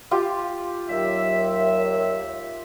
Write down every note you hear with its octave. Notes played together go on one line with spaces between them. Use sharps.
F4 G4
D#2 F#3 E5